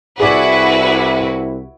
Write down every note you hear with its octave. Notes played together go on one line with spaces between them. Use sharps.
C2 E4 F#4 G#4 B4 D5